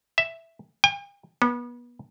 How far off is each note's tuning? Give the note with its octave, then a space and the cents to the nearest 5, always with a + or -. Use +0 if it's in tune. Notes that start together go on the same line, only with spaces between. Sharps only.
E5 +5
G5 +45
B3 -30